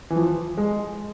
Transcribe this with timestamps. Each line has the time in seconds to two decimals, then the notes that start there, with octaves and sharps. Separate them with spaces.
0.10 E3
0.16 F3
0.57 G#3